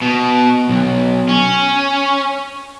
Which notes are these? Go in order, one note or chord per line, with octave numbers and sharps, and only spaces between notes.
B2
B1
C#4